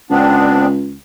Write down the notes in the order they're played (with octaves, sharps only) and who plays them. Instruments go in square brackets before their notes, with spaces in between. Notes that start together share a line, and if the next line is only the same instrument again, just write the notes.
[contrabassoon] C#2 [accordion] B3 C4 D4